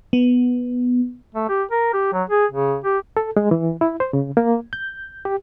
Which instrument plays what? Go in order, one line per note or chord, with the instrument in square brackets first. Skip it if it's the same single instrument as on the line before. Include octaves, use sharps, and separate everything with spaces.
[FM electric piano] B3
[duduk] A3
G4
A#4
G4
F#3
G#4
C#3
G4
[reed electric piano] A4
G#3
E3
E4
C5
C#3
A#3
G6
G4